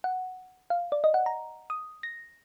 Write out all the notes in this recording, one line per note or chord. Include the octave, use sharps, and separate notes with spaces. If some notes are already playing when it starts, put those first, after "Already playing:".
F#5
F5
D5
D#5
F#5
A#5
D#6
A#6